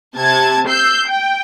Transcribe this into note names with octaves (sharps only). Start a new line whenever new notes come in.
C3 A5 G#6
E6 G6 C7
G5